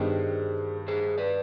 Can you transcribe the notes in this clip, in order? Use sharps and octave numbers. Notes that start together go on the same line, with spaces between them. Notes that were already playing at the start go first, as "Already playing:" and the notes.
Already playing: G2 D#3 G3 B3 G#4 C5
G#4 C5
B4 D5